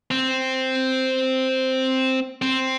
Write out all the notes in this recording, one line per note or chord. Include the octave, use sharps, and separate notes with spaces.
C4
C4